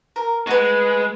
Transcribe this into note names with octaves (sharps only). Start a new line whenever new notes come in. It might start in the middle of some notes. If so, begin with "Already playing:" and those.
A#4
G#3 F#4 B4